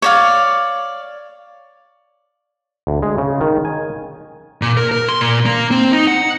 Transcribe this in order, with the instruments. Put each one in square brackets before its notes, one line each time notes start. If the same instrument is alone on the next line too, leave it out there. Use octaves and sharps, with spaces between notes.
[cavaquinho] C#5 D5 F5
[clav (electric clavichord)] D2
G#3
C#3
D#3
G#5
[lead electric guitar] A#2
A#4
A#4
C6
A#2
A#3
C4
D#4
F#5